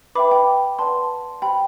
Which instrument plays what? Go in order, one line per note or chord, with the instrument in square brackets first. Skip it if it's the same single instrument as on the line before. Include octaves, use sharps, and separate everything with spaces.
[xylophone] B4 E5 G5 B5 D6
G5 B5
B4 D5 F#5 A5 C6
G4 C5 F#5 G5 B5